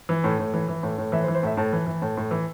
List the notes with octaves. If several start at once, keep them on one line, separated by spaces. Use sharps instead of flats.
E3
A2
A2
E3
E3
A2
A2
E3 E5
C5
E3
C5
A2 E5
A2 A5
E3
E3
A2
A2
E3